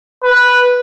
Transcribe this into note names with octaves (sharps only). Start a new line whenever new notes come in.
B4